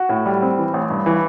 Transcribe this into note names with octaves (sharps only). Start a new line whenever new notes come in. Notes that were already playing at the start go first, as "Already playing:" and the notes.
Already playing: F#4
A2
G3
C4
E3
A1
G2
E3